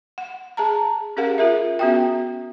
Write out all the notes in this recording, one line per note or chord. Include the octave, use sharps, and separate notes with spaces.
F#5
G#4 A5 A#5
C#4 G4 G#4 A#4 F5 F#5
F4 G#4 A#4 E5
B3 C#4 F#4 E5 G5